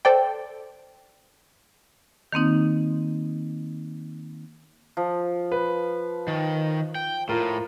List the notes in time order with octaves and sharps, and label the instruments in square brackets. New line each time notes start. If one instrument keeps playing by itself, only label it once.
[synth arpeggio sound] A4 C5 D5 G5
[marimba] D#3 A#3 C4 D#4
[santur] F3
[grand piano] B4
[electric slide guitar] D#3
G5
[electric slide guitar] A2 [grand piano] F4 A#4